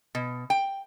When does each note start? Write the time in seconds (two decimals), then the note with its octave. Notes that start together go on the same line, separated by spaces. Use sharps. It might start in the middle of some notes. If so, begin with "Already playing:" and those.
0.15 B2
0.50 G5